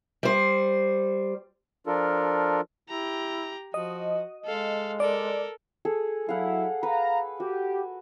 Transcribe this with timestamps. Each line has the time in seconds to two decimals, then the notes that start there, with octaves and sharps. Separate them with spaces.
0.23 G3 C5
1.87 F3 D4 F4 A4 A#4
2.89 E4 G4 A#5
3.74 F3 F#4 D#5
4.45 G#3 A4 F5
5.00 A4 A#4 D5
5.85 G#4 A4
6.29 F#3 E4 F5 F#5
6.83 B4 F5 A#5
7.40 F#4 G4